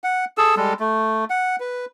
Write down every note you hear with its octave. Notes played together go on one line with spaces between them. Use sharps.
F#5
G#4 A4 E6
G3 G#3 A4
A3
F#5
B4